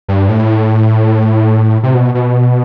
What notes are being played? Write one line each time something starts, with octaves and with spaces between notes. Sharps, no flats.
G2
A2
C3
B2
B2